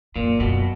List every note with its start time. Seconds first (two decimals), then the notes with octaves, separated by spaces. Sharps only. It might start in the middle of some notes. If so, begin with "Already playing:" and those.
0.16 F#2 A#2
0.40 F#2 B2